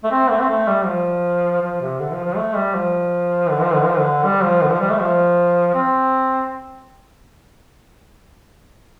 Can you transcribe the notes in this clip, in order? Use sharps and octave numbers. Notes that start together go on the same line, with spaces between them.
A3
C4
A3
C4
A3
G3
F3
F3
C3
D3
F3
F3
A3
G3
F3
D3
F3
D3
F3
D3
G3
F3
D3
F3
G3
A3
F3
C4